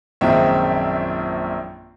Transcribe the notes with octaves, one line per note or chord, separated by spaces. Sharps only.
A#1 F#2 D#3 G#3 C4 E5